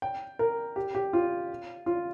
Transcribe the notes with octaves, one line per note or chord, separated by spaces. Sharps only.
G5
A#4
G4
G4
F4
F4